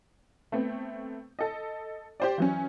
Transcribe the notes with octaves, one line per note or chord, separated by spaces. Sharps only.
A3 B3 C4
A4 D#5
G4 C5 D5
E3 F#3 C#4